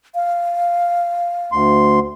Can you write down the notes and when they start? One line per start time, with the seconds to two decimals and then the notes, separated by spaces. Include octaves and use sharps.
0.15 F5
1.52 D2 C6